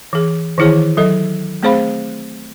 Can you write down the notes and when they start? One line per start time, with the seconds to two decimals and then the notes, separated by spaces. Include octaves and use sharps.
0.13 E3 G#4
0.58 D#3 E3 E4 G#4 C#5
0.97 F#3 A4 D#5
1.63 A3 C4 G#4 C5 F5 B5